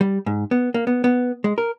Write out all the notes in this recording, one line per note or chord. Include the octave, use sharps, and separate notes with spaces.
G3
G#2
B3
A#3
B3
B3
G#3
A#4